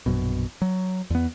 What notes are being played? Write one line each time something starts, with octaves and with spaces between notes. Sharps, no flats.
A#1 F#2 B2
F#3
E2 B3